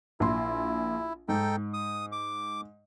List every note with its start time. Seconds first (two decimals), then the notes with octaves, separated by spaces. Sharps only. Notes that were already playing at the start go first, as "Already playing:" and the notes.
0.20 A#1 E4 C6
1.28 G#2 D#4 A4 G5
1.74 D#6
2.12 D6